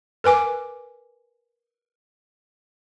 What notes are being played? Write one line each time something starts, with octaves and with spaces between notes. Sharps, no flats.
A#4 B4 G#5 D6